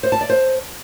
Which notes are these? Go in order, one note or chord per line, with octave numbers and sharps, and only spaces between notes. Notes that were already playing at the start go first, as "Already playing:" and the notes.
C5
A5
D5
C5